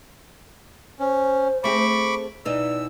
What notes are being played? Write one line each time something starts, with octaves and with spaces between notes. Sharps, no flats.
C#4 C5
A3 C4 G#4 B5 C#6 D6
B2 E3 D#4 D5 E6